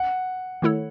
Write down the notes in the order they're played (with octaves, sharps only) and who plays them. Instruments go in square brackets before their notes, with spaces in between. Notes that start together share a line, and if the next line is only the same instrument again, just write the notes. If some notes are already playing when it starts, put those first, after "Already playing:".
Already playing: [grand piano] F#5
[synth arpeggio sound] D#3 A3 E4 A4 C#5